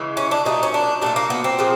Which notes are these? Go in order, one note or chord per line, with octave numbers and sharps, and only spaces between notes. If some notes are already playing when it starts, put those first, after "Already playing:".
Already playing: C#3 E3 G#3
C#4
D4
A#2 F#3 A3 D#4
C#4
D4
A#2 F#3 A3 D4
A#3
B3
C4
A#2 F3 G#3